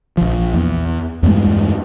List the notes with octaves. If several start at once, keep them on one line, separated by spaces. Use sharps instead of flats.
A#1 F3
E2
E2 G2 G3 G#3